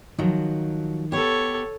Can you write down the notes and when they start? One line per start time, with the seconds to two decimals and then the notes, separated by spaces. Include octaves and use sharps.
0.19 D#3 F3 F#3
1.12 B3 G4 A4 C#5